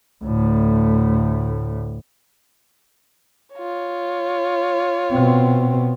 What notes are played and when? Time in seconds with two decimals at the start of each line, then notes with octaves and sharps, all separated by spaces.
0.23 D2 A2
3.54 F4 C#5
5.10 B2 C4